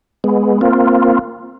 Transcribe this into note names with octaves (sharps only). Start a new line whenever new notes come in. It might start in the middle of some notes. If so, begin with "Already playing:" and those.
G#3 B3
A#3 C4 F4